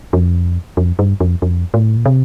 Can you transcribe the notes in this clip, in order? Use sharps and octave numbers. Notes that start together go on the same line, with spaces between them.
F2
F2
G2
F2
F2
A2
A#2
C3